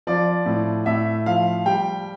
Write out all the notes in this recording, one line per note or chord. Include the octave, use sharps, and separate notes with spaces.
F3 D5
A2
A2 E5
F3 F5
G3 G5